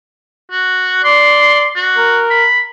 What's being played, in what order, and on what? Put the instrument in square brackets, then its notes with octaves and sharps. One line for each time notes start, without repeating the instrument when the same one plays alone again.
[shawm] F#4
[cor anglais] D5 [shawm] C6
[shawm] F#4
[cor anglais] A#4
[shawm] B5